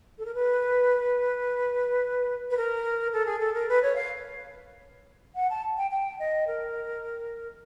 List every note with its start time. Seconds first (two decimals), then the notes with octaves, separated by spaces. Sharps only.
0.18 A4
0.25 A#4
0.34 B4
2.50 B4
2.57 A#4
3.12 A4
3.26 G#4
3.39 A4
3.54 A#4
3.69 B4
3.82 C#5
3.95 F5
5.35 F#5
5.50 A5
5.77 G5
5.90 G5
6.19 D#5
6.47 A#4